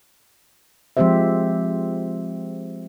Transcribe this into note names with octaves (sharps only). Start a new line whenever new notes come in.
F3 G#3 C4 G4 C5 E5